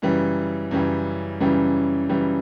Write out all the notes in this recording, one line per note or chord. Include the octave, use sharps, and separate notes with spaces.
F#2 C#3 E3 G3
F#2 C#3 E3 G3
F#2 C#3 E3 G3
F#2 C#3 E3 G3